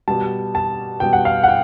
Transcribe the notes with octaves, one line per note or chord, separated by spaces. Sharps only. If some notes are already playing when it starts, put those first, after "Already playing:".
B2 G3 A5
A5
B2 G3 G5
F#5
F5
F#5
G5